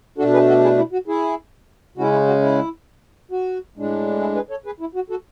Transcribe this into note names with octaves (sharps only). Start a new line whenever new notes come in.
B2 A3 D4 F#4 A4
G#4 B4
F#4 A4
E4 G#4
E4
F#4
E4 G#4
C#3 G#3 C#4 E4 F#4
E4
F#4
E4
F#4
A2 G#3 D4
E4 G#4
G#4 B4
A4 C#5
G#4 B4
E4
F#4
F#4 A4